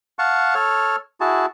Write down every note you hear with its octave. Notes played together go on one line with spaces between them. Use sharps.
F5 F#5 A5 C#6
A4 C#5 F6
E4 F#4 G#4 A5